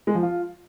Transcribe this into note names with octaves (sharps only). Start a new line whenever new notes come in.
G#3
F3
F4